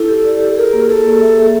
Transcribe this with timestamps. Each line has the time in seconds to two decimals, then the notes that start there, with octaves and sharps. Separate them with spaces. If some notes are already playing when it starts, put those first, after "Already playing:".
Already playing: E4 A4
0.08 G4
0.25 D5
0.40 G4
0.57 G#4 A#4
0.73 A#3
0.89 G#4 A4
1.06 A#3
1.22 E5
1.38 G#4